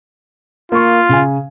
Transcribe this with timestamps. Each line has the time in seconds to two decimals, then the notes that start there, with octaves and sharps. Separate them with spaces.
0.72 A#3 F4 C#6
1.09 C#3 G#5